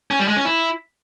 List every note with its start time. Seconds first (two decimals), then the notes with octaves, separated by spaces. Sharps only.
0.11 C#4
0.19 G3
0.28 G#3
0.36 C#4
0.45 E4